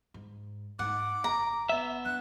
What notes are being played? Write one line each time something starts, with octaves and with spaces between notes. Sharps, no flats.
G#2
G#2 F#5 D6
F#1 A#5
F#1 B3 E5
D4 F#6